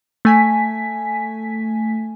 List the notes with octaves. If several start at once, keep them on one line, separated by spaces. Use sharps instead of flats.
A3 G#5 B6